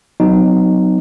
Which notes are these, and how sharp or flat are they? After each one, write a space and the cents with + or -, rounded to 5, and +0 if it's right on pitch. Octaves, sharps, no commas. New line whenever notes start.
F#3 +0 B3 +40 D#4 -10